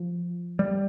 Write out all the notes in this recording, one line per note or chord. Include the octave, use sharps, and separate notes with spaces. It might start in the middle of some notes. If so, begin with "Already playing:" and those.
Already playing: F3
G3